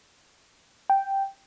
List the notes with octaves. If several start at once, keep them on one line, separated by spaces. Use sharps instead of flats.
G5